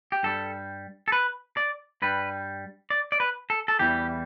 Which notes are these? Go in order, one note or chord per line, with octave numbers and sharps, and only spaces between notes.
G4
G2 G3 A4
A4
B4
D5
G2 G3 B4
D5
D5
B4
A4
A4
E2 E3 G3 G4